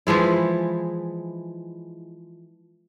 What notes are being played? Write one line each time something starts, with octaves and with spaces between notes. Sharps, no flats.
E3 F3 G#3 E4